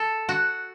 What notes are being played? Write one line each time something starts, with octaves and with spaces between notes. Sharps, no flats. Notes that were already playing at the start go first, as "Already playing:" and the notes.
Already playing: A4
F#4